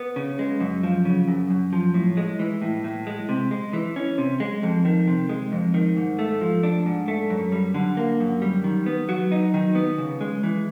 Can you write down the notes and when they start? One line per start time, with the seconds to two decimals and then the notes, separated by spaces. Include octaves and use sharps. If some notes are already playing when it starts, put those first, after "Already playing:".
Already playing: B3
0.16 C#3
0.39 G#3
0.60 F#2
0.83 F3
1.05 C#3
1.28 F#2
1.50 F#2
1.73 F3
1.94 A2
2.17 G#3
2.39 E3
2.62 A2
2.84 A2
3.07 G#3
3.29 C3
3.51 G#3
3.73 E3
3.96 C#4
4.18 C3
4.40 G#3
4.63 F2
4.85 D#3
5.07 C3
5.29 G#3
5.52 F2
5.74 D#3
5.97 G#2
6.19 A3
6.41 F3
6.63 D4
6.86 G#2
7.08 A3
7.30 F#2
7.52 G3
7.74 D3
7.97 A#3
8.20 F#2
8.42 G3
8.64 D#3
8.86 B3
9.09 F#3
9.32 D#4
9.54 D#3
9.75 B3
9.98 C#3
10.21 G#3
10.43 E3